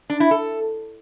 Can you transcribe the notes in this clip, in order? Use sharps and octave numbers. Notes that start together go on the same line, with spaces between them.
D4
E4
A4